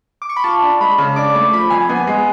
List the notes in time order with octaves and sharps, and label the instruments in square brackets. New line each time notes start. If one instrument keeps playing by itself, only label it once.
[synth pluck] D6
C#6
B5
[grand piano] F4 [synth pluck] A5
[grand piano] D4
[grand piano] G#3 [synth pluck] B5
[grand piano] C#3
[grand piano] D4 [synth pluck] D6
[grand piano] A3
[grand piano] F3 [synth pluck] B5
[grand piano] F2 [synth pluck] G#5
[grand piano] B3 [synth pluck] G#5
[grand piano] G#3